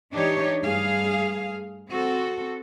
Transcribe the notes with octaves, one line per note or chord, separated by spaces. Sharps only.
E3 D4 D#4 G4 C#5
G2 A3 G#4 F5
C4 F#4 A4